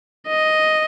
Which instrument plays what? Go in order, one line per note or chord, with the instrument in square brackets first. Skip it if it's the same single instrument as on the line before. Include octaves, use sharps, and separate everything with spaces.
[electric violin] D#5